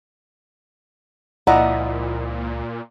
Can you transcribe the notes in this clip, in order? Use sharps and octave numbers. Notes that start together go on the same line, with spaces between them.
C#2 A#2 F3 E4 D5 D#5 F#5 A#5